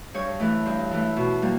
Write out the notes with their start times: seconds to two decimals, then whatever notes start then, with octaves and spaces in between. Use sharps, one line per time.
0.14 G2 C#5
0.40 E3 A3
0.66 G2
0.91 E3 A3
1.16 B2
1.42 G3 A#3